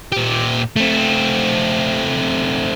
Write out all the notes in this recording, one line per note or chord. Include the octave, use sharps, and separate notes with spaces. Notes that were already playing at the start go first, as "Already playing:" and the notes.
A#2 G4
A3 C4